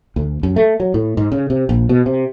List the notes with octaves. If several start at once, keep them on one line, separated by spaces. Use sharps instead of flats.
D2
F#2
A3
F#3
A2
G#2
C#3
C3
A#1
B2
C3